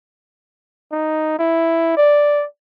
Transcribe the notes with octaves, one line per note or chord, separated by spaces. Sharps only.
D#4
E4
D5